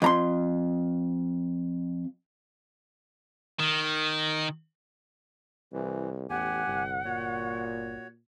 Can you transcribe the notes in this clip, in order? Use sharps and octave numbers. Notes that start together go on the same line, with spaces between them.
F2 A#5 C6
D#3
C2 E3
A1 E2 G4 F#5 G#5
G1 C2
A#2 F#4 C#5